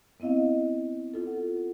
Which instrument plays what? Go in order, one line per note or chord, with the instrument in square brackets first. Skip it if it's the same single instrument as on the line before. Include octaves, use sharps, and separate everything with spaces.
[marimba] B3 C4 E4 D#5 F5
F4 A4
F#5